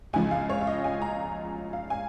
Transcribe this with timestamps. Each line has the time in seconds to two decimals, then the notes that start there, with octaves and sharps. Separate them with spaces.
0.13 C#2 C#3 F3 G#5
0.31 F5
0.49 C#5
0.61 F5
0.67 D#5
0.84 G#5
1.02 A#5
1.73 F5
1.90 G#5